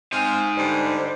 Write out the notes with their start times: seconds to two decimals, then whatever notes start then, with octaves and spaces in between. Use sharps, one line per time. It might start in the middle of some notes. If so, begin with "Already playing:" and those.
0.13 C4 D#4 F5 G#5
0.57 G2 D3 G3 C5